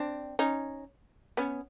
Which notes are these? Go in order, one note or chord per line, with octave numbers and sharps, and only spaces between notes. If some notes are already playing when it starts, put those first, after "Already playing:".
Already playing: C4 D4
C#4 D#4
B3 C#4